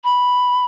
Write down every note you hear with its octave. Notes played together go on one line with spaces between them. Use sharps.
B5